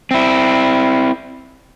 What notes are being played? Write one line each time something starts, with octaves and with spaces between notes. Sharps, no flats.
C4 E4